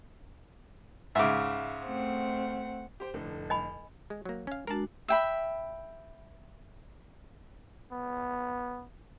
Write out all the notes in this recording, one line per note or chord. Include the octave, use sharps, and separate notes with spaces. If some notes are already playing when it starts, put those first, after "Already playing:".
G#2 C#3 E5 D6
A3 C4 F#5
G4 C5 G5
F1 A2 D3
D#5 G#5 B5
G#3
F#3 A#3
C#4 F5
G#3 D4 F#4 A#4 A5
E5 G5 B5
B3